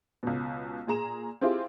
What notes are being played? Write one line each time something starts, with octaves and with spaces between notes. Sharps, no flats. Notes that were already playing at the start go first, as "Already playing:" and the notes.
C#2 B2
A#2 G#4 A#5 E7
C4 E4 F4 G4 G#4